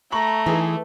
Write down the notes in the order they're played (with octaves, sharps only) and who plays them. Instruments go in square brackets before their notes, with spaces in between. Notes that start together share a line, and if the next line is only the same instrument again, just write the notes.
[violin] A3 [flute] A#5 [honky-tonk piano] B5 C#6 F#7
[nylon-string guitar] E3 [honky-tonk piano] D#4 G#4